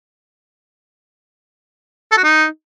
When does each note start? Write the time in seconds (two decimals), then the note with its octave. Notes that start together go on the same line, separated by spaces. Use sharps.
2.12 A4
2.18 F#4
2.24 D#4